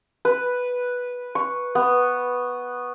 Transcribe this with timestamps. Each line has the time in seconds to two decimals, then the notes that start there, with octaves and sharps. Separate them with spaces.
0.25 B4
1.35 C#6
1.75 B3